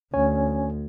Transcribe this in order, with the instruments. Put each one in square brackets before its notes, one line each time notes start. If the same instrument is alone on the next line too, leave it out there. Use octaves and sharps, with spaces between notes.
[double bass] D2 [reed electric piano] C#4 C#5 G#5